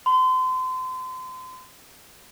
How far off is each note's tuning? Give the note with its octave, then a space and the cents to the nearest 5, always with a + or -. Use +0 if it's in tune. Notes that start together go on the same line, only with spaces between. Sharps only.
C6 -35